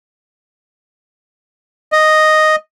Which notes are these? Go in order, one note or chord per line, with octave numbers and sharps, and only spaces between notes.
D#5